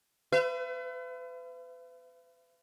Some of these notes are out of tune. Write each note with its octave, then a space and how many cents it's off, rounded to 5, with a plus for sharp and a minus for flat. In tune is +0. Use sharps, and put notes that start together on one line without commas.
B4 +40 E5 +45